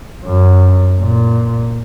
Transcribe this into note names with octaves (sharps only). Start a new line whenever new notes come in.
F#2
A#2